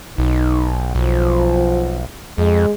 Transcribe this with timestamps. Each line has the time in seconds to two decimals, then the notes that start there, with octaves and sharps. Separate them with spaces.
0.18 B1 D#4
0.95 B1 F3
2.38 F2 G#3